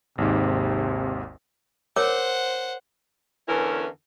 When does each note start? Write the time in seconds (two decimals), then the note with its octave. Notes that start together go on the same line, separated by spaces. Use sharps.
0.18 G#1 D#2 G#2 C3
1.96 A#4 C5 C#5 F#5 D6
3.48 E2 D3 E3 C#4 E4 A#4